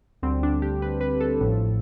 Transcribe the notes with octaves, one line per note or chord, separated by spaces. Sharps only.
D2 D3 G3 C4
D4
G4
B4
B4
A4
A1 A2 F3